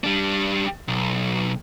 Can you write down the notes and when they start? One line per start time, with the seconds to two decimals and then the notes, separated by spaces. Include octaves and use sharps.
0.04 G3 D4
0.88 B1